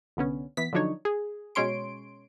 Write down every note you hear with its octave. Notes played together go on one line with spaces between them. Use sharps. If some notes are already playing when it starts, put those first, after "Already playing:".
C2 D3 B3 C#4
E3 B3 B6
D3 F3 F#3 D4 D#4 C#5
G#4
B2 G#3 C#4 C#5 C6 D7